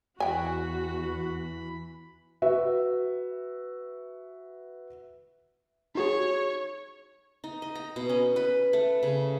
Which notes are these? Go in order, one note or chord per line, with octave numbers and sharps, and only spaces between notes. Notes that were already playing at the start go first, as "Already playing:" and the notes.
E2 E3 F#4 G5 G#5 B5
F#4 B4 E5
D#4 F#4 G#4 C#5
D#4
D#5
A#5
B2
C#4
B4
A3
C#3